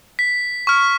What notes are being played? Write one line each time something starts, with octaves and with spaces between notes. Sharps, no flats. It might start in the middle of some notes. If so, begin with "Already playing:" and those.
B6
C#6 F6